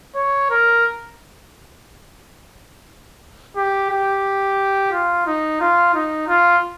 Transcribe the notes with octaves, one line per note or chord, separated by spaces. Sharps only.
C#5
A#4
G4
G4
F4
D#4
F4
D#4
F4